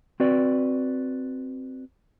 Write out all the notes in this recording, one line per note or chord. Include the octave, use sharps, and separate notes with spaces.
C4 F#4 B4 D5